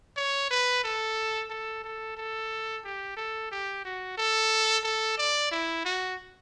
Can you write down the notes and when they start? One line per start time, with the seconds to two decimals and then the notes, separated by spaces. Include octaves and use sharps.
0.17 C#5
0.51 B4
0.84 A4
1.50 A4
1.84 A4
2.17 A4
2.84 G4
3.17 A4
3.51 G4
3.85 F#4
4.17 A4
4.84 A4
5.18 D5
5.51 E4
5.85 F#4